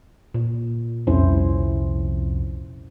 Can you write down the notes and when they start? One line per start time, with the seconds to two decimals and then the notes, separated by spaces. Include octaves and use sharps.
0.34 A#2
1.07 C2 F2 C#4 E4 C5